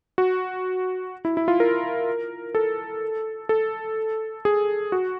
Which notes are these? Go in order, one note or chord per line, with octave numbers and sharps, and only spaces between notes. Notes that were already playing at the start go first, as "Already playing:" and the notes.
F#4
E4
E4
F4
A#4
A4
A4
G#4
F#4